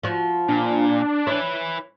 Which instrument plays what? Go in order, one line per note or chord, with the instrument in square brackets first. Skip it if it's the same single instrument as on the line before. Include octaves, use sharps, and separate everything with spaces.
[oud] F3 F#4
[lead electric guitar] A#2 [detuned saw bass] D4
[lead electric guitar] E4 B4 [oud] C#5